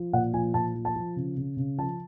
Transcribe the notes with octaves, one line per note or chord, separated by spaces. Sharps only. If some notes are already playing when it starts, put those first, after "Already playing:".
Already playing: F3
A#2 F#5
F3 G#5
A#2 A5
F3
A5
F3
C#3
C#3
C#3
F3 A5